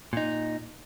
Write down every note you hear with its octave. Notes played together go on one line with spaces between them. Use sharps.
A#2 D#4